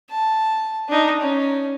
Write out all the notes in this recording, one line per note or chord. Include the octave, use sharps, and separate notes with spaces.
A5
D4 D#4
C#4